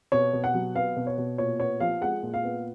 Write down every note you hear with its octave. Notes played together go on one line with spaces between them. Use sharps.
B2 C#5
B2
F#5
F#3
B3 F5
B2
C#5
B2
A#2 C#5
B3 C#5
F3 F5
G#3 F#5
A#2
F5
B3